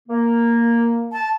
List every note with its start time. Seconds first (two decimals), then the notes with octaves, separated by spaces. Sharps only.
0.09 A#3
1.12 A5